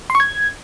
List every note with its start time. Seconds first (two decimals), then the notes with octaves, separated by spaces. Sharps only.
0.10 C6
0.15 C#6
0.20 G#6